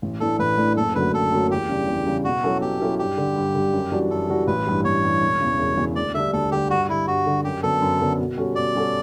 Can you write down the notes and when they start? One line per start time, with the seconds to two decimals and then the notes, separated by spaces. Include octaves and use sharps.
0.02 A1
0.20 A2 E3 A3 D4 A4
0.39 A1 B4
0.57 A2 E3 A3 D4
0.76 F#1 A4
0.95 F#2 D3 F#3 A3 B4
1.13 F#1 A4
1.32 F#2 D3 F#3 A3
1.51 E2 G4
1.69 C#3 G3 D4
1.87 E2
2.06 C#3 G3 D4
2.24 B2 F#4
2.44 F#3 C#4 E4 A4
2.61 B2 G4
2.80 F#3 C#4 E4 A4
2.99 G2 G4
3.17 D3 G3
3.36 G2
3.55 D3 G3
3.73 F#2
3.92 E3 G3 D4 F#4
4.10 F#2 A4
4.29 E3 G3 D4 F#4
4.47 A1 B4
4.66 G2 E3 G3
4.84 A1 C#5
5.03 G2 E3 G3
5.21 E1
5.40 E2 C#3
5.59 E1
5.77 E2 C#3
5.96 D2 D5
6.14 D3 G3 D4 E5
6.33 D2 A4
6.52 D3 G3 D4 G4
6.70 G2 F#4
6.89 D3 G3 E4
7.07 G2 F#4
7.26 D3 G3
7.44 F#2 G4
7.63 D3 F#3 B3 A4
7.82 F#2
8.00 D3 F#3 B3
8.19 B2
8.37 G3 C#4 F#4 A4
8.55 B2 D5
8.74 G3 C#4 F#4 A4